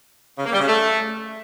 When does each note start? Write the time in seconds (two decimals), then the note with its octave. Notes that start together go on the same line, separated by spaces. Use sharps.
0.38 C#3
0.45 A#3
0.53 G3
0.60 C#3
0.68 A3